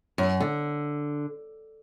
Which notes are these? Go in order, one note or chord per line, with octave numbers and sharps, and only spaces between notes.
F#2
D3